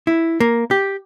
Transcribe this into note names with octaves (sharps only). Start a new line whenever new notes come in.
E4
A#3
G4